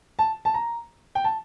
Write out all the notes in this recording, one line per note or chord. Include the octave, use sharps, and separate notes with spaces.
A5
A5
A#5
G5
A5